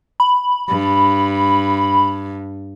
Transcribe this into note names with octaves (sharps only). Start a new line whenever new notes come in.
B5
G2